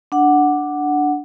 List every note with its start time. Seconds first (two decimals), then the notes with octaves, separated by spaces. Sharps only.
0.12 D4 F#5